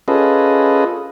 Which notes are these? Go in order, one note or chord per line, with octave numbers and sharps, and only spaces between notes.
C#4 F4 G#4 A4 B4 D#5